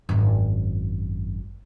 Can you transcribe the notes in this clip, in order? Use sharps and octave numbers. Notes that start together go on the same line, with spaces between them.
G#1 F#2